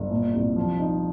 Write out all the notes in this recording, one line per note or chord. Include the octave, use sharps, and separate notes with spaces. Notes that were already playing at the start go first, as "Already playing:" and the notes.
Already playing: G1
A#2
C2
F3
D#4